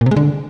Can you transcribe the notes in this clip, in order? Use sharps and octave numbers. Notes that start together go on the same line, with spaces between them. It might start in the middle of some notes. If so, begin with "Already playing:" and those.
A#2
C3
G#3
D3